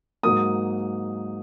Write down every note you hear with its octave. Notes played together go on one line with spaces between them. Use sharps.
G#2 F#3 A#3 D#6